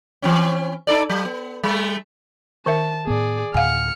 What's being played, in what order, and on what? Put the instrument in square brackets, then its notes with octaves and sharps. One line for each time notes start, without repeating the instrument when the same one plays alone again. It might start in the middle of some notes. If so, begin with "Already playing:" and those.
[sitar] E3 C4 C#4
D#4 A4 D5
F#3
B3
G3 A3
[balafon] D#3 A#4 E5 [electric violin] A5
[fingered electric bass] A2 B3 [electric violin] G#4 D5
[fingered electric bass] D2 A2 [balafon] F5 F#5 G#5 [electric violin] F6 C#7